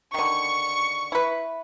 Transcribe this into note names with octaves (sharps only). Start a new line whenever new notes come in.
D3 D#3 C#6
E4 B4